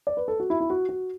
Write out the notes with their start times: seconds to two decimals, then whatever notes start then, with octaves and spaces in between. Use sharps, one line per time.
0.07 D5
0.17 B4
0.28 A4
0.40 F#4
0.50 E4
0.61 E4
0.70 F#4
0.89 F#4